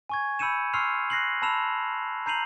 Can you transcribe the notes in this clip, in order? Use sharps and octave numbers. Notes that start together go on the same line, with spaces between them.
G#5 C#6 G#6
B5 E6 G6 C#7 D#7 E7
C6 C#6 E6 F6 C7 F7
F#6 A#6 C7 F#7
A5 B5 E6 E7 F7
A#5 G6 C7 D#7 F7 F#7